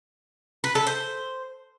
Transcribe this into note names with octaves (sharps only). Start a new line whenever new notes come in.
B4
A4
C5